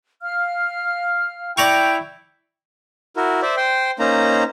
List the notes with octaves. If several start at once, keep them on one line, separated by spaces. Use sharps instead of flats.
F5 F6
E4 D5 G5 A#5 C#6
E4 F#4 A#4
C5 D5 E5
C5 G5 C6
A#3 C#4 D#4 C5 A#5